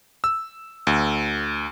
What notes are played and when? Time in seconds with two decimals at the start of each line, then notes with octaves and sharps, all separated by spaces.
0.24 E6
0.87 D2